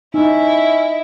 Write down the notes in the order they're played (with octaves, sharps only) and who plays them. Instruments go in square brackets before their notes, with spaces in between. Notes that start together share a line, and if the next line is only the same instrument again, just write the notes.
[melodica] C#4 E5 [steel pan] D#4 [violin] E4 [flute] D#5